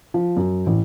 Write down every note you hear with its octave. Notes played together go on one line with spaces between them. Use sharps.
F3
F#2
A1